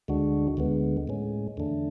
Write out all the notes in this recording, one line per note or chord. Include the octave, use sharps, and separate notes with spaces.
D2 D3 G#3 D4 F#4
D2 D3 G#3 B3
A2 G#3 C#4
E2 D3 A3 D4